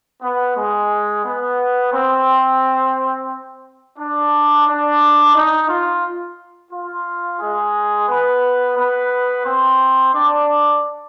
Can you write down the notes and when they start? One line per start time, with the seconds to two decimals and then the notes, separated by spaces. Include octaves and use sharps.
0.22 B3
0.56 G#3
1.25 B3
1.93 C4
3.98 D4
4.67 D4
5.35 D#4
5.69 F4
6.72 F4
7.39 G#3 G#4
8.08 B3 B4
8.76 B3 B4
9.45 C4 C5
10.13 D4 D5